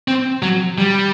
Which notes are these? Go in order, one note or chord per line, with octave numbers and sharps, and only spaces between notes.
C4
F#3
G3